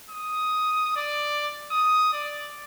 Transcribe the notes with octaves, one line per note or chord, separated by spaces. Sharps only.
D#6
D5
D#6
D5